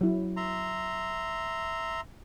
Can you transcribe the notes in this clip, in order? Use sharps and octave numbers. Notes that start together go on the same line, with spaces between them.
F#3 E4
E5 A#5 C6